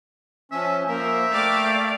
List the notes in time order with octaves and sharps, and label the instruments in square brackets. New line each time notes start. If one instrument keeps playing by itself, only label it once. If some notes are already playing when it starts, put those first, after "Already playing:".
[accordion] F3 C#4 [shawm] E5
[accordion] F3 A#3 [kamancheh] A#4 C5 [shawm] E5
[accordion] A3 [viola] D5 F5 [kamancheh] G5 D6